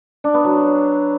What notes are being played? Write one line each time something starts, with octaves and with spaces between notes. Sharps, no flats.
D4
B3
F#3